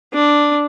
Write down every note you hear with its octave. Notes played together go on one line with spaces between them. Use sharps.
D4